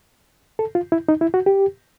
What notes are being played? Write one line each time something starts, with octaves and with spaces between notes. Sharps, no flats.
A4
F4
E4
D#4
E4
F#4
G4